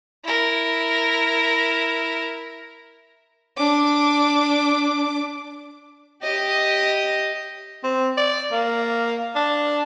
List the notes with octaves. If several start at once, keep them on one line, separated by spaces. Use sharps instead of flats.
E4 A#4
D4 D6
G4 D#5
C4
D5
A#3
D4